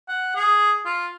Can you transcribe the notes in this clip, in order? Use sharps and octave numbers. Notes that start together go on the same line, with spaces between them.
F#5
G#4
F4